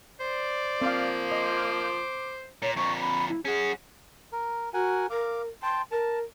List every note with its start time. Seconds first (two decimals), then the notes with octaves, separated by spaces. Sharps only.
0.20 C5 D5
0.81 F3 A#3 C4 F5
1.31 D#5 D6
2.62 A#2 C#5
2.76 F2 A#2 C#6
3.00 B5
3.29 E4
3.45 C#4 F#4 G#4
4.32 A#4
4.74 F#4 A#4 F#5 G#5
5.10 A#4 F5 D6
5.63 G5 A5 C6
5.91 A#4 A5